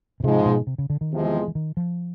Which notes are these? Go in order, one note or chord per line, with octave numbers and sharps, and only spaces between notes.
B2
G#2 C3 F3 G#3
B2
C3
C#3
D3
D#3
E2 C3 F3 G#3
E3
D#3
F3